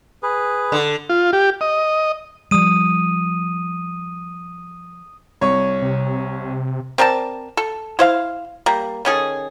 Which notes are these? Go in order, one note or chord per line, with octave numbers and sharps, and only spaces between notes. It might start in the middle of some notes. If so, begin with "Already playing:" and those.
G#4 B4
D3
F4
G4
D#5
F3 G3 D#6 D#7
C2 C#5 C#6
C3
C4 A#4 D5 A5
A4
E4 C5 F5
G3 A#3
D#3 C#4 G#4 A4